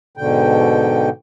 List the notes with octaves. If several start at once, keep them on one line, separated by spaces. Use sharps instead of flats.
G#2 B2 D3 G5